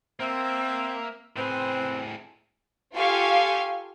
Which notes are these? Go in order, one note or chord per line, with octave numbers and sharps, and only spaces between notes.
A#3 C4 E5
A2 C4 G#4 B4
F4 G4 A4 F5 G#5 C#6